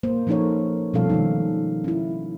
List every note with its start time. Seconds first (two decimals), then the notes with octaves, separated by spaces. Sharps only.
0.03 A#3 C5
0.27 F3 C#4 D#4 A4 A#4 C#5
0.93 B2 F3 G3 C#4 A4 F5
1.10 D#3 G#3 D#4
1.84 C#4 E4